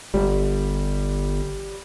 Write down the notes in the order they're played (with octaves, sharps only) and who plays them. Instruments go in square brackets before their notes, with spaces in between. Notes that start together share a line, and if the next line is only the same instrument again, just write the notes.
[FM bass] G1 [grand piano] G3